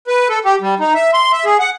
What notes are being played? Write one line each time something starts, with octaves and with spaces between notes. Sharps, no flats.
B4
A4
G4
G3
D#4
E5
C6
E5
G#4
F#5